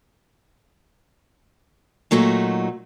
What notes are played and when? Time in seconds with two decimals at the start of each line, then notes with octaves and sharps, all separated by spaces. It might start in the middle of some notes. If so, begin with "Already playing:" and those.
2.11 A#2 F#3 A3 D#4 F#4